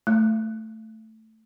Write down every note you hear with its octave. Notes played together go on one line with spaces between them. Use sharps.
A3